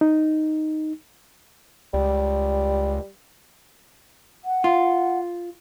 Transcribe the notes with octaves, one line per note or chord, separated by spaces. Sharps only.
D#4
C#2 G3
F#5
F4